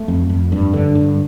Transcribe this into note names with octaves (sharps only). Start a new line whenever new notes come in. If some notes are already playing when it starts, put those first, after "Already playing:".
Already playing: A3
F2
F2
G2
D3
G2